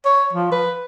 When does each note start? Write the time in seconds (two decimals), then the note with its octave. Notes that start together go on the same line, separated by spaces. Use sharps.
0.05 C#5
0.33 F3
0.52 B4